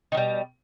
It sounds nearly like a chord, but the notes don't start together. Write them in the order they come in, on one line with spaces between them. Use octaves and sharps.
D#3 B2 G3